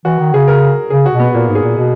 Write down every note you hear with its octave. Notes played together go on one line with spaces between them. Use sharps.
E3 F#4
D#3
C#3 G#4
A#4
C#3 G#4
F#4
B2
B3
A#2 A#3
G#2
G#4
A#2
B2